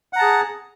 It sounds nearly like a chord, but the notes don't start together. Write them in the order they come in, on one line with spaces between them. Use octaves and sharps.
F#5 A#5 A5 G#4